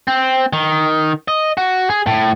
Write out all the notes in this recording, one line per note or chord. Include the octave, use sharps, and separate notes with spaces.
C4
D#3
D#5
F#4
G#4
A2